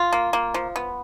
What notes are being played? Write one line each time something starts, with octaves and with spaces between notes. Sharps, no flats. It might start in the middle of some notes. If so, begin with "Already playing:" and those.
Already playing: F4
A#3
A#3
F3
B3